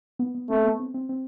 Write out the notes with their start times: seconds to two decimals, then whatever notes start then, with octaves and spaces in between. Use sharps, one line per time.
0.19 B3
0.35 B3
0.50 A3 C4
0.64 B3
0.80 C4
0.94 C4
1.09 C4